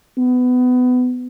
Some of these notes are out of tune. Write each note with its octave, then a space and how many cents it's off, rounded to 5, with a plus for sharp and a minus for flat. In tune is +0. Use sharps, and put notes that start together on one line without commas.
B3 +20